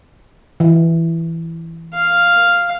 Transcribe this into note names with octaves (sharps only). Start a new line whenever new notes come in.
E3
F5